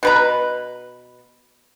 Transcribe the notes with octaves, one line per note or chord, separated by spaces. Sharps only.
B2 B4 A#5